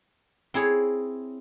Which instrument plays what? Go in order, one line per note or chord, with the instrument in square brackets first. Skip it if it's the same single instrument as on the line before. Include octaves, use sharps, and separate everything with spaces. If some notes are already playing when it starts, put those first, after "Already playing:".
[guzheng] C4 E4 G#4 C#5